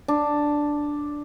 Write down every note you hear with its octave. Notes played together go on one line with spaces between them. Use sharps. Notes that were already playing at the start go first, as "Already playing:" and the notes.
D4